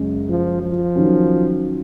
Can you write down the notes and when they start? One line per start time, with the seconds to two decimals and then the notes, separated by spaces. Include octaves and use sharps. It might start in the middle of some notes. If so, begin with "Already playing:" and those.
Already playing: F#2 C#3 G#3 C#4 G#4
0.29 F3
0.62 F3
0.95 D#3 F#3 C#4